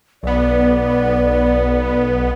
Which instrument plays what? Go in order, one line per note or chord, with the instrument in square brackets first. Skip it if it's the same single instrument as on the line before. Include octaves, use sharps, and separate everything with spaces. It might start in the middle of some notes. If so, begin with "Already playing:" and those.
[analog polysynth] B1 B3 [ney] D5